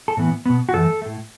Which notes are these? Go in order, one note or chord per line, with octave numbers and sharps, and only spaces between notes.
A4
A2 E3 B3
B2 B3
F#4
F#2 E3 A3 A4
A2 A3